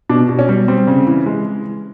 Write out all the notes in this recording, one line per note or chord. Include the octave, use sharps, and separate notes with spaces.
B2 D4
B2
C#4
G3
G3 C4
C#3
E3
G#3